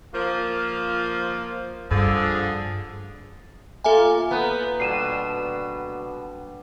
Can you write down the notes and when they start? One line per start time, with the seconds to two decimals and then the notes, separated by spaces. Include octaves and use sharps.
0.13 F3 A#3 F4
1.91 G2 D3 F3 G#4
3.84 A#3 F4 A4 E5 G#5
4.31 B3 D#4 B4
4.80 B2 D3 G3 C7 D#7 E7